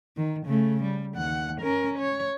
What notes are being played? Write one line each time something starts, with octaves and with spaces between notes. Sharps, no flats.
D#3
C#3 A3
G3
D#2 F#5
C#4 A#4
C#5